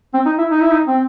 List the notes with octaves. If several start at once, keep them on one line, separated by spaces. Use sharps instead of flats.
C4
D#4
E4
D#4
E4
D#4
C4